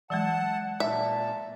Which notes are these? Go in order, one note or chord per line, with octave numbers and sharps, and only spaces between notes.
E3 F#3 G#3 F#5 A5
A#2 E5 A5